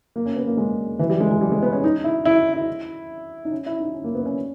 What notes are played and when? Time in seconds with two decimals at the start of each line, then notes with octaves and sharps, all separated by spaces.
0.16 A#3
0.26 C#4
0.36 B3
0.47 A#3
0.57 G#3
0.99 E3
1.10 G3
1.20 G#3
1.31 G#3
1.41 G3
1.52 G#3
1.63 B3
1.73 C#4
1.84 D#4
2.04 E4
2.25 E4
2.54 E4
3.45 D#4
3.52 C#4
3.66 E4
3.80 D#4
3.94 C#4
4.04 A#3
4.15 B3
4.26 C#4